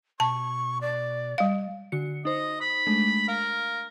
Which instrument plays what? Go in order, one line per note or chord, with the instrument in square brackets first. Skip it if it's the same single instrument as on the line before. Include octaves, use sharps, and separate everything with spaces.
[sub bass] B2 [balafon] A5 [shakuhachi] C#6
[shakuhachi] D5
[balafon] G3 F5
[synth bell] D3 F#4 C#7
[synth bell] D#4 C5 [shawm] D#5
[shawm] B5
[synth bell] G#3 A3 D4
[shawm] A#4 [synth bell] F5